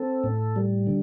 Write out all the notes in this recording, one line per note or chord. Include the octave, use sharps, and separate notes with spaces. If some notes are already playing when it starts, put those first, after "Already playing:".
Already playing: C4 A4
A2
G3
D3